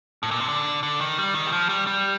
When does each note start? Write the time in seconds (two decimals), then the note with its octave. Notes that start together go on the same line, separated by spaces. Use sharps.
0.23 A2
0.31 A#2
0.40 C3
0.49 D3
0.83 D3
1.01 D#3
1.18 G3
1.34 D#3
1.47 G3
1.52 F3
1.69 G3
1.87 G3